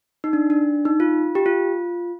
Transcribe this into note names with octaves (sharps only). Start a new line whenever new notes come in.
D#4
D4
D4
D#4
F4
G4
F4